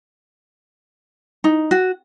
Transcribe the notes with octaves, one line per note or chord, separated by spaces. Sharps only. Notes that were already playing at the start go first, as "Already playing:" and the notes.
D#4
F#4